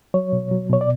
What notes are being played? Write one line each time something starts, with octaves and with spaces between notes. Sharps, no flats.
F#3 C#5
B2
F#3
B2 C#5
D5